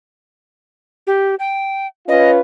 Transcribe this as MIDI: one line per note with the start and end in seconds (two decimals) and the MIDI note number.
1.07 1.35 67
1.39 1.87 79
2.08 2.41 61
2.08 2.41 65
2.08 2.41 71
2.08 2.30 75